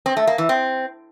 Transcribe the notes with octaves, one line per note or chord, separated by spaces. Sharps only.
C4
A3
A#3
E3
C4